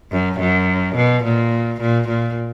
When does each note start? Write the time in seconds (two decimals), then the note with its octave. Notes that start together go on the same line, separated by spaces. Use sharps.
0.12 F#2
0.40 F#2
0.96 B2
1.24 A#2
1.81 A#2
2.09 A#2